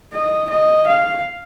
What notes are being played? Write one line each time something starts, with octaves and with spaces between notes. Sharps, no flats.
D#5
D#5
F5